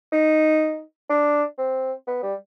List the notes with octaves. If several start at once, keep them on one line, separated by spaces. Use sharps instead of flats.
D#4
D4
C4
B3
G3